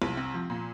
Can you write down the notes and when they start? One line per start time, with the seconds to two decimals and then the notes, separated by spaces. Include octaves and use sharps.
0.02 C2
0.17 C4
0.34 F3
0.50 A#2